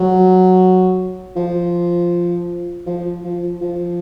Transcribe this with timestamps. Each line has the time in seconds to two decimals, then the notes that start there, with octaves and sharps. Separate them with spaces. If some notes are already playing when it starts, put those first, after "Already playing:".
Already playing: F#3
1.36 F3
2.86 F3
3.24 F3
3.61 F3